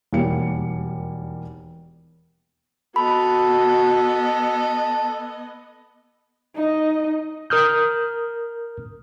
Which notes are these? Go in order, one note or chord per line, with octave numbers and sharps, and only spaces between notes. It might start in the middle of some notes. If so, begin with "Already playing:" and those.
E1 D#2 G3 A#3 C#7
B3 F#4 A4 D#5 B5
D#4 D#5
A#4 D#6 F6 G6